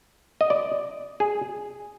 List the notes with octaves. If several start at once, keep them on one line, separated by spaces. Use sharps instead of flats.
D#5
D5
G#4